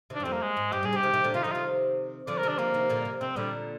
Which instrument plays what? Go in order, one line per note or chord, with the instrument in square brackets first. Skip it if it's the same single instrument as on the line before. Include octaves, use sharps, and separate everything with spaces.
[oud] C3 D#3 [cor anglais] D4
[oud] G2
[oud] F2 [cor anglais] C4
[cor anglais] A#3
G#3
[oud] G#2
[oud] G2 [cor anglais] G4
[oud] A#2 [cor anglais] G#4
[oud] C3
[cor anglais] G4
[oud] C3 D#3
C3 D#3
A#2 D3
[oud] C3 D#3 [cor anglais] F4
[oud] D3 F3 [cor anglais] D#4
[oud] C3 D#3 [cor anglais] F4
[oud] D3 F3 [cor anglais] D5
[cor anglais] A#4
[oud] C3 D#3 [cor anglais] D4
[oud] D3 F3 [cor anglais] A#3
[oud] C3 D#3
A#2 D3
C3
[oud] C3 [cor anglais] C4
[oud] A#2 D3 [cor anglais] G3